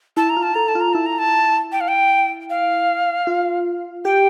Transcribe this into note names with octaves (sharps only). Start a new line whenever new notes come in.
E4 A5
A#5
F4
A5
A4 A#5
A5
F4
A#5
E4 A5
A#5
A5
G5
F5
G5
F5
F4
G4 G5